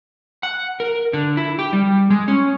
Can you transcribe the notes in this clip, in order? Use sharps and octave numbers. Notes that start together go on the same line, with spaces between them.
F#5
A#4
D3
E4
G4
G3
G#3
C#4